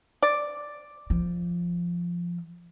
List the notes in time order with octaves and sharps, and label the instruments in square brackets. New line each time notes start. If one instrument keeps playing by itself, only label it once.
[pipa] D5
[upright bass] F3